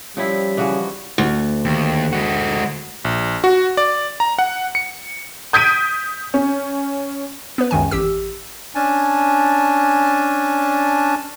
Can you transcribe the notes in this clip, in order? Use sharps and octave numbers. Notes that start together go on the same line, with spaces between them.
F3 G3 C4 C#4 E4 C#5 B6
C#3 E3 F3 F#4
D2
D#2
G#3 F#4
A#1
F#4
D5
A#5
F#5
C#7
D#6 G6 G#6 B6 D7 D#7
C#4
B3 B4
C#2 F#2 D#3 G#5
A1 G4 E6
C#4 D4 G#5 A5